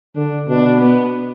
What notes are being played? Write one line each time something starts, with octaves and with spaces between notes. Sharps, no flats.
D3 D4
B2 D4
B3